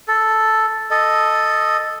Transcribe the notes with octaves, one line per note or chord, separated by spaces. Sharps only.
A4
A4 D#5